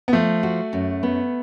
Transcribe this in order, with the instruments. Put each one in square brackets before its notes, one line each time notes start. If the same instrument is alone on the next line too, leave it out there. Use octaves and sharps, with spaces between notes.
[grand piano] B3
[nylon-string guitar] F3 [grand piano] A3
[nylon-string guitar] F#4
F#2
B3